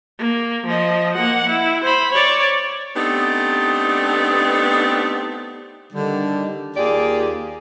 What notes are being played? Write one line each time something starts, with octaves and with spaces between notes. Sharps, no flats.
A#3
F3 D#5
A#3 F#5
E4
C5 B5
C#5 D5
A3 B3 C4 D4 D#4 G4
D3 D#3 G3
D#2 A#3 F4 G4 G#4 D5